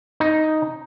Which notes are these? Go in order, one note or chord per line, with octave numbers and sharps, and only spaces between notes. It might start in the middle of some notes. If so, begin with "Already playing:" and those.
D#4